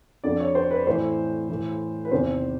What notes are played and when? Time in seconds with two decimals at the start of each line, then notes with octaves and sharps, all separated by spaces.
0.24 F2 D3 D5
0.40 C#5
0.55 C5
0.71 B4
0.87 A2 E3 C5
1.49 A2 E3
2.05 B4
2.11 E2 C3 D#3 C5